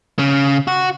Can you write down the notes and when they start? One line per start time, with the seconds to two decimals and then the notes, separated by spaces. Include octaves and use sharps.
0.19 C#3
0.68 F#4